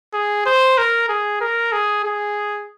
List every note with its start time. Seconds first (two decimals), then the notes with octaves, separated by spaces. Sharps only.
0.13 G#4
0.46 C5
0.78 A#4
1.09 G#4
1.41 A#4
1.72 G#4
2.04 G#4